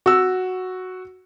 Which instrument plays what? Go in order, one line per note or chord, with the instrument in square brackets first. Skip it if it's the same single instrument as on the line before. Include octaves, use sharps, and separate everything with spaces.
[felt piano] F#4 E6